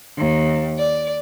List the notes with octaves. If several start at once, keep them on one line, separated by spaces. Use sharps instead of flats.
D#2
D5